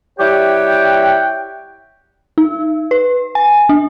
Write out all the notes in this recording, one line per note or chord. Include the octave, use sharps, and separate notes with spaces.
G3 E4 G4 C#5 F#5 G5
D#4
B4
G#5
D4